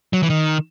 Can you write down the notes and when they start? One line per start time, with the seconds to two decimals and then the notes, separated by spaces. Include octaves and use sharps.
0.13 F#3
0.23 E3
0.30 D#3